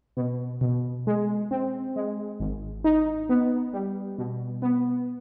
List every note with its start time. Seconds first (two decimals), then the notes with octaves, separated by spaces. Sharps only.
0.17 B2
0.61 B2
1.07 G#3
1.51 C4
1.96 G#3
2.40 G#1
2.84 D#4
3.29 B3
3.73 G3
4.18 B2
4.62 B3